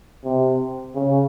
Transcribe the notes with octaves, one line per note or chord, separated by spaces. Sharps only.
C3
C#3